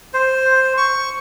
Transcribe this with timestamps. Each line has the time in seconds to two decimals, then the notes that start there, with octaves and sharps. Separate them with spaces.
0.14 C5
0.78 C#6